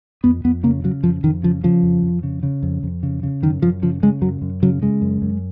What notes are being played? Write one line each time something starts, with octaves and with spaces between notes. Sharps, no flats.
F2 B3
F2 B3
C#3 A#3
C#3 F#3
F2 F3
F2 D#3
C#3 F3
C#3 F3
F2
F2
C#3
C#3
F2
F2
C#3
C#3
F#2 D#3
F#2 F3
C#3 F3
C#3 G#3
F#2 F#3
F#2
C#3 F#3
C#3 G#3
F#2
F#2